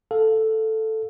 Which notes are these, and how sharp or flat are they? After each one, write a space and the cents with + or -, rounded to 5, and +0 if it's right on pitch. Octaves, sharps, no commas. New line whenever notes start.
A4 +0 F5 +15